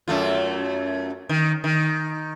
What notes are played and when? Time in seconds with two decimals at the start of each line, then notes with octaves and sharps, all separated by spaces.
0.08 F#2 A3 F4
1.29 D#3
1.64 D#3